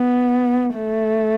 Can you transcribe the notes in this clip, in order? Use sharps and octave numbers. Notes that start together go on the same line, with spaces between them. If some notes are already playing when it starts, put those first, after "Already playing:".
Already playing: B3
A3